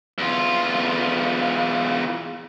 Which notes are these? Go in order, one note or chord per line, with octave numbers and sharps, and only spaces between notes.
E2 F4